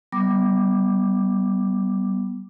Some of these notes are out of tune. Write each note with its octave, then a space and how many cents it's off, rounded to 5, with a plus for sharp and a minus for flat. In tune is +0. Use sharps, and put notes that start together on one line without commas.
G3 -25 B3 -10 D6 +5